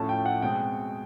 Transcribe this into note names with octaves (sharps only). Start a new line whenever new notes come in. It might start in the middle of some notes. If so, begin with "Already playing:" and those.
Already playing: A2 F3 A3 C#4 A5
G5
F#5
B2 G#3 C4 G5